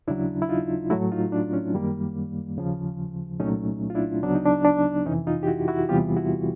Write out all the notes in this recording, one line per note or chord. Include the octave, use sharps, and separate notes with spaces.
D#2 C#3 F#3 D4 E4
E4
D#4 F4
A2 F#3 A3 E4 F#4
D#4 F4
D4
C#4
F#2 D#3 G3 A#3
D#2 C#3 F3
C2 A#2 F#3 A3 C#4 D#4
F4
D4 E4
D2 C#3 F#3 B3 D4
D#4
D4
D4
F2 C3 E3 C#4 D#4
D#4 F4
G4
E4 F#4
E4 F#4
E2 C3 E3 G3 B3 F4 G4
E4 F#4